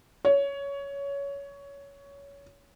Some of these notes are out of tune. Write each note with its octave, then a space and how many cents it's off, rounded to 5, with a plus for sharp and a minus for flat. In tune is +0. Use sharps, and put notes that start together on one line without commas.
C#5 +15